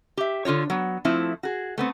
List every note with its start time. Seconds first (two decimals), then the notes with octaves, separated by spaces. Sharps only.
0.17 G4 E5
0.45 D3 F4 F#4 C#5
0.70 F#3 B3
1.05 F3 A3 C4 E4
1.43 F#4 G#4
1.78 A3 B3 C4